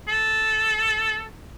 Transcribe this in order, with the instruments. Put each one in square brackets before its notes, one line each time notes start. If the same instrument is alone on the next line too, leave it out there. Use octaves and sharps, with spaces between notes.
[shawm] A4